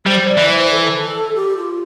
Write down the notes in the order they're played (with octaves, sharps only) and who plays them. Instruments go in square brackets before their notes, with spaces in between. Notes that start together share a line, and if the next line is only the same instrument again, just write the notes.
[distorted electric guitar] G3 [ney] C5
[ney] D5
[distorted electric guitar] E3
[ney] C5
A4
G4
F4